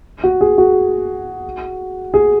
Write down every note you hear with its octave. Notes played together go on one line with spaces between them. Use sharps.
F#4
G#4
F#4
G#4